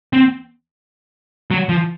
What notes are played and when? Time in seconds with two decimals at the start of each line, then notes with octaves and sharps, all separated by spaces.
0.13 C4
1.51 F#3
1.69 F3